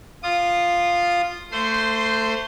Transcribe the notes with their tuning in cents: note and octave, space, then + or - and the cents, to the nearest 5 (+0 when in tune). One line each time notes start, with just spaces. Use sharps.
F4 +0 D#6 -25
A3 +20 C5 -15 C6 +0